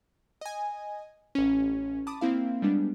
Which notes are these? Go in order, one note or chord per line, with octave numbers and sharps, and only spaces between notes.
D#5 G#5
A1 C#4
A5 B5 D6 D#6
A#3 C4 E4 F5
G3 G#3 B3 D4